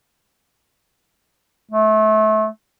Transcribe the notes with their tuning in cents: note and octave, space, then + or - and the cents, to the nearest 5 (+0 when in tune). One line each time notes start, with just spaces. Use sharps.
A3 -30